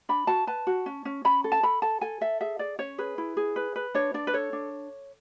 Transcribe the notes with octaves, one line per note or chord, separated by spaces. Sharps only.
D4 B5
F#4 A5
B4 A5
F#4
C#4
C#4
C#4 B5
A4
A5
A4 B5
A4 A5
A4 G#5
A4 E5
G#4 E5
G#4 D5
C#4 C#5
G#4 B4
E4
G#4
B4
B4
D4 C#5
D4 D5
B4
A4 C#5
D4